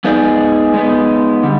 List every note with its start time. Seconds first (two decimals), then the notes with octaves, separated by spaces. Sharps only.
0.04 G#3 B3 D#4 G#4 D5
0.74 G#3 B3 D#4
1.43 D3 G3